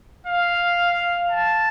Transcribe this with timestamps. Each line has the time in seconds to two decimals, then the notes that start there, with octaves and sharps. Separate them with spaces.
0.27 F5
1.31 A5